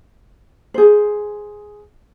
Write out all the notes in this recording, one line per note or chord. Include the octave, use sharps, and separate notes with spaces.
G#4 C5